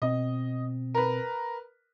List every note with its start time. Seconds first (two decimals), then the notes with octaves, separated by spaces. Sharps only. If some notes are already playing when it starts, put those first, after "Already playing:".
0.02 B2 C4 D#5
0.94 A#4 B4